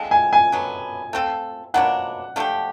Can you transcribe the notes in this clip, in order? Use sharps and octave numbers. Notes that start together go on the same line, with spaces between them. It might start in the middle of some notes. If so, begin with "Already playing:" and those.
Already playing: D3 F3 G#3 C4
G#5
G#5
D3 F#3 B3
A3 C4 F4 A4
B2 F#3 A#3 D4 F#5
F3 A3 D4 G4